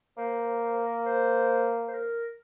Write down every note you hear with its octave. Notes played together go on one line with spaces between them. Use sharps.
A#3 C5
C5
C5
A#4
C5
C5
A#4